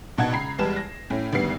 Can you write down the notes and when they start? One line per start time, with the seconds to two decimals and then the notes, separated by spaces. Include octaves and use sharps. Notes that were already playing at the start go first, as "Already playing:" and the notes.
0.18 A#1 B2 D#4 F#5 A5 G#6
0.32 C#2 A#5 B5 C7
0.58 E2 G3 G#3 B4 A5 E7
0.76 A#6
1.10 A2 A3 C#4
1.32 G#1 D2 G3 B3 B4 C7